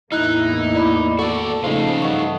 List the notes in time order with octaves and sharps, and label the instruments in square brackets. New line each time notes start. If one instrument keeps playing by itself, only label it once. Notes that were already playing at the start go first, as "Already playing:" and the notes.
[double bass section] E2 A2 A#3 [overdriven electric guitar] D#4 [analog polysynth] E4 [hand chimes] F6 F#6
[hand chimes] D5 B5 D6
[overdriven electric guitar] F#4 D5 [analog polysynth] A4 [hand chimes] C#6
[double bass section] C#3 F3 A3 [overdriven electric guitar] D#4 F4 [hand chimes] C5
[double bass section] G2 E3 [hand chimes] D#5 F#5 C#6